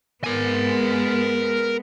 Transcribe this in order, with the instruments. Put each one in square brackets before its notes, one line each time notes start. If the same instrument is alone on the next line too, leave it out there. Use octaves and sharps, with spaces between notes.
[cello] G#3 B3 [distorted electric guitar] A#4 G#5